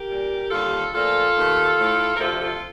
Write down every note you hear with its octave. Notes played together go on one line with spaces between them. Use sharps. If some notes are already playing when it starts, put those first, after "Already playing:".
Already playing: G4 A#4
A#2 G3
D#2 D3 G3 F4 A4
A#2 F3 A3 F4 A4
D#2 D#3 A3
A2 A3
A#4
D2 C3 F3 A3 F4 A4
F4 A4